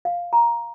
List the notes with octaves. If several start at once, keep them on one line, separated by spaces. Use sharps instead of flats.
F5
A#5